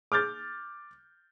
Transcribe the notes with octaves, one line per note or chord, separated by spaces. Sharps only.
D6 F6 G6 A6